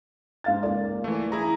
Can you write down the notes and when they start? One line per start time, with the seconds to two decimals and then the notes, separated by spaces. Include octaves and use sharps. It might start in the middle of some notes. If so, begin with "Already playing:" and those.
0.44 G#2 F5 A6
0.63 C#2 A#3 D5
1.04 E3 A3
1.32 E4 G#4 A#5